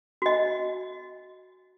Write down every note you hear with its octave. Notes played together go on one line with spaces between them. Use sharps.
F#4 D#5